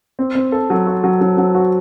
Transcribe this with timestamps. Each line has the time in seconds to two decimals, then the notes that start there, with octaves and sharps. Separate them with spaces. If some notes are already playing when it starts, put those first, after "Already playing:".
0.19 C4
0.35 C4
0.52 A4
0.70 F#3
0.87 F#4
1.04 F#3
1.21 F#3
1.38 F#3
1.55 F#4